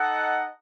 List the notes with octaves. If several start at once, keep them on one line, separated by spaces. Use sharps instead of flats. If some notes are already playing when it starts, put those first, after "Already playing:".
Already playing: D#4 A4 D#5 F#5